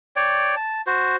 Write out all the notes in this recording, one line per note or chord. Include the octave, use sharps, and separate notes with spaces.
C#5 D5 G5
A5
F#4 C5